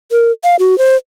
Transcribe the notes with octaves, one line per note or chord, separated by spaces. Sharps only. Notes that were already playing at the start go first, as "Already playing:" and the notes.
A#4
F5
F#4
C5